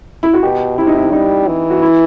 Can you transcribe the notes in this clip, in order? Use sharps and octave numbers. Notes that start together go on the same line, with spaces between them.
E4
F#4
B2 G4
C3 E4
D#4
E4
G3 D#4
E3
F#4
E4